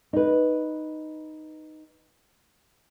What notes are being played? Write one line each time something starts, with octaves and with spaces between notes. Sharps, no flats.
D#4 B4